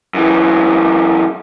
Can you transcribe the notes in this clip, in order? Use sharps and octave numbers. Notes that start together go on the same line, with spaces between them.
F#2 E3